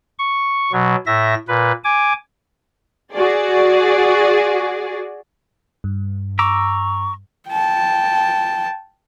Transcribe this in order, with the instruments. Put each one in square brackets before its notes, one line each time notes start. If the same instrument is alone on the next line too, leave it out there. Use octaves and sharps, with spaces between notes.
[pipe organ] C#6
B2 F#3
A2 E5 A#6
A#2 B4
G#5 D6
[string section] F#4 G#4 D5
[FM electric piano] G2
[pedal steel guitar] A#5 D6 E6 [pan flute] C#6
[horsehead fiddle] G5 A5